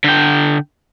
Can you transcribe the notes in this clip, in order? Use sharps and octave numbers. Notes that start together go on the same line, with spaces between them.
D3 G5